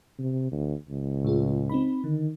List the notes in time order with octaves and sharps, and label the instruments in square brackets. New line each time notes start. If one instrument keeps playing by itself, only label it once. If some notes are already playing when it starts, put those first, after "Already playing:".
[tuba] C3
D2
C#2
[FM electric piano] A2 F4 G#4
C4 D#4 B5
[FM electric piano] D3 [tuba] D#3